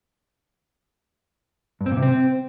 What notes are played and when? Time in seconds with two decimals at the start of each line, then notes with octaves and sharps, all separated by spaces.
1.81 G2
1.86 C4
1.92 A#2
1.97 C3
2.02 C4